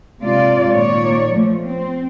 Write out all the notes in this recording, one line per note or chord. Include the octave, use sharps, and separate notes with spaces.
C3 G#3 F4 D5
A#2 D#3 C#5 D5
F3 A3
C4